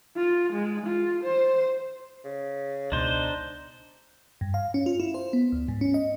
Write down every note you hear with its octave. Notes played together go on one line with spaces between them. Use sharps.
F4
G#3
F4
C5
C#3
C#2 B2 D4 D#4 C5
G2
F5
C#4
F4
E4
C5
B3
D2
G#2
C#4
D#5